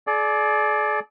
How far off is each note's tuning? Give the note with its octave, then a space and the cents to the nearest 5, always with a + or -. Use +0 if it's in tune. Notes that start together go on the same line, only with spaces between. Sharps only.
G#4 +45 D5 +0